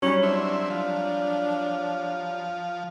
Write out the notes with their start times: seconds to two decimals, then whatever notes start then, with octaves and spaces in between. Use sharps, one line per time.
0.02 F#3 G3 C#4
0.23 C4 D4 E4
0.70 F3